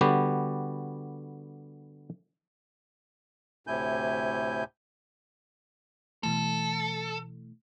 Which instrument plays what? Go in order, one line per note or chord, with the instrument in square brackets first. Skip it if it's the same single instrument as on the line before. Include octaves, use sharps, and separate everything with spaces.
[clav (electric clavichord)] D3 G3 B3 F#4 G4
[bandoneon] D2 A2 C3 E4 G#5 G6
[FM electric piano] B2 E3 A3 [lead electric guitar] A4